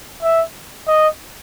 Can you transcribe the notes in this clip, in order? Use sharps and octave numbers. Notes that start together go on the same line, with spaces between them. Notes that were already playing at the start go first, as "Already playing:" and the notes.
E5
D#5